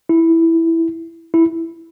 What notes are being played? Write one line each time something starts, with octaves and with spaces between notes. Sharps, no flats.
E4
E4